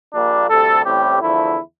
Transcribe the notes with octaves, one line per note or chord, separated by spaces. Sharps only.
A#1 A#2 G3 A#3 D4
D2 C3 G3 A4
A1 A2 G3 C4 G4
E2 D3 F3 A3 E4